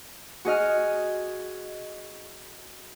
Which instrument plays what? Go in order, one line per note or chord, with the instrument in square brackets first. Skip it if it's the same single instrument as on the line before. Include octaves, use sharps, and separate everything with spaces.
[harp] F#4 G#4 D#5 F6